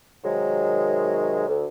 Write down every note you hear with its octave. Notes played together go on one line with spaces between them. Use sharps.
C3 D#3 F#3 G#3
D2